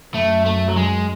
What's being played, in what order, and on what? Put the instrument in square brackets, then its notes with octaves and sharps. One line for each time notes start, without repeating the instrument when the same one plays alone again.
[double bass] F#2 [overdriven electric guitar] A3
[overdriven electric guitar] A3
F#3
G#3